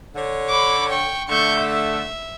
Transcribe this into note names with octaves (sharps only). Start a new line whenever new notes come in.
D3 C#5
B5 D6
G5 C#6
D3 A3 C#6 G6
E5